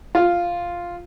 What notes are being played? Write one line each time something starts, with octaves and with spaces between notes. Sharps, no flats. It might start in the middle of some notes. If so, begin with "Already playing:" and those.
F4